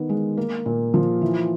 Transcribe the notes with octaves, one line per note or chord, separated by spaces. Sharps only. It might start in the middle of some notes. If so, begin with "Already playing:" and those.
Already playing: D#3 B3
G#3
A#3
A#2
F3
E3